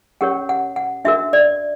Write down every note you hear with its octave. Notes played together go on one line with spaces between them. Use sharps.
C#4 G4 A#4 C#5 F#5
F#5
F#5
D4 F#4 A#4 E5
D5